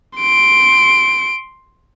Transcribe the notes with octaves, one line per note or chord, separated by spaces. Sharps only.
C6 D7